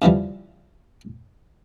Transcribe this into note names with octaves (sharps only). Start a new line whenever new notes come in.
C#3 E3 F3 G3